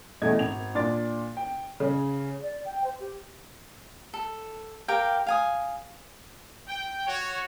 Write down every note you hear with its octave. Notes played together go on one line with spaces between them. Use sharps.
B1 E2 A3 D#5 G#6
G#1 F7
A#2 D4 C6 D6 A6
G5
C#3 C#4
D5
G5
C5
G4
A4
G4 A#4 F5 G5
F5 G#5 D#6
G5
F#4 C#5